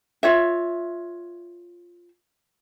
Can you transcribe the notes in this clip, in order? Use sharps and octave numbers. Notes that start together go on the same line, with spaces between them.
F4 C#5 E5